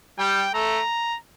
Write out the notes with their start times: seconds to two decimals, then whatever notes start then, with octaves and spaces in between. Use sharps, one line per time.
0.19 G3 G5
0.54 A3 A#5